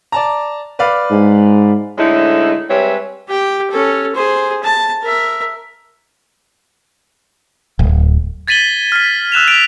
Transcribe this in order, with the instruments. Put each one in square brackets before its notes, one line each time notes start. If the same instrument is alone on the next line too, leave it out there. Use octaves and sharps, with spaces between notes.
[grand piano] D5 A5 A#5
B4 D5 F5
[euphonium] G#2
[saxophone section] A2 D3 G#3 D#4 E4
G3 G#3 C4 B4 C#5 E5
[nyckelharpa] G4 G5
C#4 A4
G#4 C5
A5
A#4 E5
[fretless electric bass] D1
[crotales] G#6 A6 B6 D#7 F#7 G7
F6 B6
E6 F#6 E7 F7
B6 D7 F7